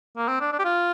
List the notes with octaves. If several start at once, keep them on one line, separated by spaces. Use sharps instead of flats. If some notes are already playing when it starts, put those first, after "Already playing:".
A#3
C4
D4
D4
G4
F4